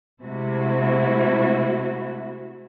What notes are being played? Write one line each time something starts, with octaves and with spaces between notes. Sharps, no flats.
C3 G#3 A3 E4 F#4